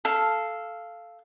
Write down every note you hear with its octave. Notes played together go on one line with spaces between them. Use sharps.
A4 F5